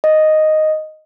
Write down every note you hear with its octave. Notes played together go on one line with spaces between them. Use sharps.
D#5